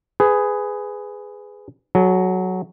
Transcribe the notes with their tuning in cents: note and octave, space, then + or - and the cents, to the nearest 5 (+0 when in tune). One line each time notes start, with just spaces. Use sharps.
G#4 +0 B4 +20
F#3 +0 A4 -45